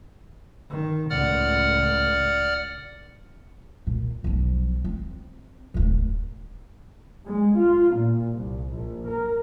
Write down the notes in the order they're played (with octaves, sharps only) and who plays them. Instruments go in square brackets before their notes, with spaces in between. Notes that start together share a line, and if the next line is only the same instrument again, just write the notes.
[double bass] D#3
[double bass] C#2 A2 [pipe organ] D5 F#5 F6
[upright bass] A#2
B1 F3
C4
D1 G#1
[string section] G#3
F4
A#2
C2
A#1
A#4